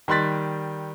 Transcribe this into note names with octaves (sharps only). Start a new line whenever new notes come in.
D#3 G3 C6 F#6 A6 B6